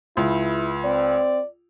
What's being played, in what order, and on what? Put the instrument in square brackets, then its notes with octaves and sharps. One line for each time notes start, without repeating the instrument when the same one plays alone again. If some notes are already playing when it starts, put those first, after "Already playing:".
[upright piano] C#2 [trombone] E4
[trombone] C4 [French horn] D5